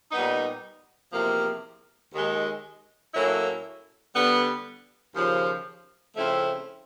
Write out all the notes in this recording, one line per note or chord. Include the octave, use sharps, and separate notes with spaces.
A#2 G3 B3 D#4
E2 C3 F3 A#3
D#2 D#3 G#3
A2 F#3 A#3 C#4 E4
D3 G3 B3
D#2 C#3 F3
C#3 F3 A3 C4 E4